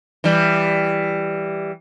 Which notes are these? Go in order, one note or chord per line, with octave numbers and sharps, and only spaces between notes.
E3 G3